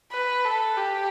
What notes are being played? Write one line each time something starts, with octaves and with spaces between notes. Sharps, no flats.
B4
A4
G4